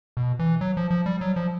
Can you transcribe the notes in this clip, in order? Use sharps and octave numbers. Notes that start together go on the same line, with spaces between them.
B2
E3
F#3
F3
F3
G3
F#3
F3